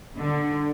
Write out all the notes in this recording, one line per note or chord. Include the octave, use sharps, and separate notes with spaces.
D3